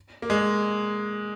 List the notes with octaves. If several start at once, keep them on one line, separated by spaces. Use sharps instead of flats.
A#3
G#3